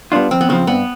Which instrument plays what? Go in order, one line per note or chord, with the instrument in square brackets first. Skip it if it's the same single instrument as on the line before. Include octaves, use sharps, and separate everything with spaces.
[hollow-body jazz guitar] G3 B3 D4 F4
[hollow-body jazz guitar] F2 [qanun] C4
[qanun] B3
[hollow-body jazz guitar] C#3 F3 [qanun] C4
[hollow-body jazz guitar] G2 [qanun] B3